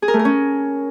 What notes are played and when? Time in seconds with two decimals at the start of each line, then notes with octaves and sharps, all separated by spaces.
0.02 G#4
0.08 A#4
0.14 A3
0.19 A#4
0.25 C#4